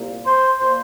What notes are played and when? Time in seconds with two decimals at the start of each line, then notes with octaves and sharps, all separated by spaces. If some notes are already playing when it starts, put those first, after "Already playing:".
Already playing: C2 A#2 A#3
0.25 C5 C6
0.59 A#2 A#3 C5 C6